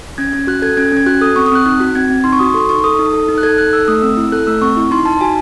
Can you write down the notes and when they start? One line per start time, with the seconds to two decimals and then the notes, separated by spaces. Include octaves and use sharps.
0.18 C#4 G#6
0.33 C#4
0.47 F#4 F#6
0.62 A4 G#6
0.77 C#4 G#6
0.92 C#4 G#6
1.06 F#4 F#6
1.21 A4 D#6
1.36 C4 C#6
1.46 D#6
1.52 C4 F#6
1.66 D#4 F#6
1.80 F#4
1.95 C4 G#6
2.10 C4
2.24 D#4 C6
2.32 C#6
2.39 F#4 D#6
2.54 A4 C6
2.69 D#4 C#6
2.84 A4 D#6
2.99 D#4
3.13 A4
3.28 D#4
3.38 F#6
3.43 A4 G#6
3.58 D#4 F#6
3.73 A4 E6
3.88 A3 D#6
4.02 C4 E6
4.17 E4
4.32 A4 F#6
4.47 A3 E6
4.62 C4 C#6
4.77 E4
4.91 D#4 C6
5.05 D#4 A5
5.21 F#4 G#5